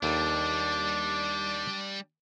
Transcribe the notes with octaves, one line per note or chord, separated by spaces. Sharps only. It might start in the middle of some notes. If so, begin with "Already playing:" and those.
D#2 G3 D4 A4